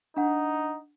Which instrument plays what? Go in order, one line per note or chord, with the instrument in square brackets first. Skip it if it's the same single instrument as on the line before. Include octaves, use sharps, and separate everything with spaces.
[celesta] D4 F#5 [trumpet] D#4